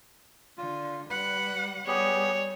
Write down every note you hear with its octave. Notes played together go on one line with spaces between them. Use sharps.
D3 F4
G3 B4 F#5 B5
G3 B3 G4 G#4 C#5